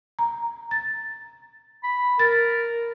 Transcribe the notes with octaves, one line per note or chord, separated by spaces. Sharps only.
A#5
A6
B5
A#4 A6